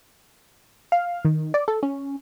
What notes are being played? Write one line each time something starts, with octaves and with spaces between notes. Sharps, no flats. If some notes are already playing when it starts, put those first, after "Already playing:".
F5
D#3
D5
A4
C#4